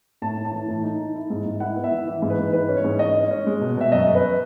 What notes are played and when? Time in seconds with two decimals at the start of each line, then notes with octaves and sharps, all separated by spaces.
0.22 A2 A5
0.37 A2
0.45 A5
0.53 E3
0.68 A2
0.84 D#4
0.99 D#4
1.14 E4
1.30 G#2
1.45 G#2
1.60 E4 F#5
1.76 B3
1.84 E5
1.92 E3
2.07 E3
2.22 G#2
2.30 B4
2.38 G#2
2.53 E3 B4
2.69 C#4
2.77 C#5
2.84 G#2
2.99 C#4 D#5
3.15 C#4
3.31 C#4
3.46 G#3
3.61 B2
3.77 B2 E5
3.92 F#2 D#5
4.08 F#2
4.15 B4